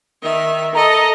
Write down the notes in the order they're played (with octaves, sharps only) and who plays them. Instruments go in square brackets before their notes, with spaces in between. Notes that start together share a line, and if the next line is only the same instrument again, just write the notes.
[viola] D#3 E5
[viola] A4 D#5 [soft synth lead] A#5